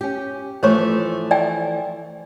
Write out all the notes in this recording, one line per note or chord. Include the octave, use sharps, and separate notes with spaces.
C#4 G4
E3 F3 A3 C5 C#5 C#6
D5 G5 G#5